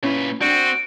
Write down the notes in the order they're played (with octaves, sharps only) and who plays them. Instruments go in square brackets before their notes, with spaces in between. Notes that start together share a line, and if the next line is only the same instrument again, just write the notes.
[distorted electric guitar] A#2 B4 [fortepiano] C#4 E4
[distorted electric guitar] C4 [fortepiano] D4 [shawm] F#4 [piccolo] D7